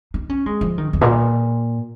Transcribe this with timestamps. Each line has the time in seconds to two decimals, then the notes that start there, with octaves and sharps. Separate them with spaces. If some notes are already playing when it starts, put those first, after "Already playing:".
0.14 D#4
0.29 C#4
0.46 G#3
0.61 F3
0.78 D#3
0.93 F2
1.01 A#2